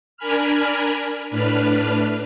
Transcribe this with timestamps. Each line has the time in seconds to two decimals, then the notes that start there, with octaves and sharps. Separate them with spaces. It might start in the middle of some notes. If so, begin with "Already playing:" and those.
0.17 D4 A#4 G#5 B5 F6
1.31 A2 D4 B4 F6